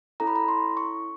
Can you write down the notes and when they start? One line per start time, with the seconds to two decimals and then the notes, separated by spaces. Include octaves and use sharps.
0.20 C#4 E4 A4 A#5
0.27 B5
0.36 A#5
0.48 C6
0.77 C#6